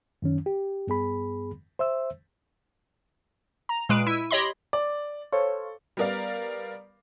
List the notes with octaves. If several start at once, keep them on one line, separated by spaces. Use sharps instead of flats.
F#2 D#3 C#4
G4
G2 B3 G#4 B5
C5 E5 E6
A#5
A#2 G#3 B4 D7
E4 E6 D#7
G4 C#5 D#5 B5 C6
D5
A4 C5 C#5 F5
G3 B3 A#4 D5 F5